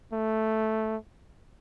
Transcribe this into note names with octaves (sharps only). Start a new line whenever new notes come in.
A3